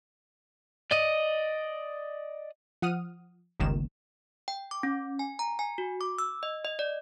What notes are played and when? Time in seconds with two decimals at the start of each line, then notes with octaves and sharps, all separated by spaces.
0.91 D5 D#5
2.82 F3 F#5 D#6 F6 D#7
3.60 G1 C#2 D#3 A#3 E7
4.48 G5
4.71 D6
4.83 C#4
5.19 G#5
5.39 A#5
5.59 G#5
5.78 F#4
6.01 D6
6.19 E6
6.43 D#5
6.65 D#5
6.79 D5